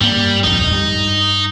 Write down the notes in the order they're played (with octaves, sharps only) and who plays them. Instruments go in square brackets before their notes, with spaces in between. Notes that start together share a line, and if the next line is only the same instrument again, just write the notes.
[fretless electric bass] G2 A#3 [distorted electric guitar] G3
[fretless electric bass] D1 A#1 F2 [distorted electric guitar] D#4
[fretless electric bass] G2 G3